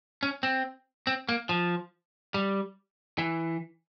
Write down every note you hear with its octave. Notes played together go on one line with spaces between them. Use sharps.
C#4
C4
C4
A#3
F3
G3
E3